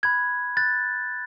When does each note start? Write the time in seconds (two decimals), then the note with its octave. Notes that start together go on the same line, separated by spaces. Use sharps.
0.03 B5 F#6 G#6
0.57 F#6 A6